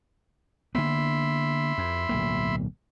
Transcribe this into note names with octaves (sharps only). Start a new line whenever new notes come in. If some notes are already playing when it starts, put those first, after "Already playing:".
D3 A#3 B3 E5 B5 C6
F2
D1 B1 A#3